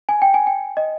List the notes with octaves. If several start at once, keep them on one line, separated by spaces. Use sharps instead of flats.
G#5
G5
G#5
G5
D#5